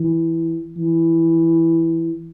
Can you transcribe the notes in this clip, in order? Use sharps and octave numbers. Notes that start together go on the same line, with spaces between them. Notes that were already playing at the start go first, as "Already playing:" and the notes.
Already playing: E3
E3